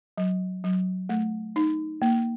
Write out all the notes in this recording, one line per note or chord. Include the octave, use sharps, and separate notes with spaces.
F#3
F#3
A3
D#4
A#3